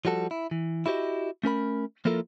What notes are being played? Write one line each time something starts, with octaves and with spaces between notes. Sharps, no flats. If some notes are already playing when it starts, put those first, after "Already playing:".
F3 G3 F#4 A4
E4
E3
E4 F#4 G4 C#5 D#5
A3 C#4 A#4 B5
F3 A#3 E4 F4 A4 A#4